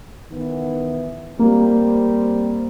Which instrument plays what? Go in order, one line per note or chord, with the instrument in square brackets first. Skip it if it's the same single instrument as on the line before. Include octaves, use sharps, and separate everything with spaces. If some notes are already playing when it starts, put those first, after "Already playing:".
[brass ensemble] D#3 E3 B3
[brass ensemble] G3 C4 [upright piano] A#3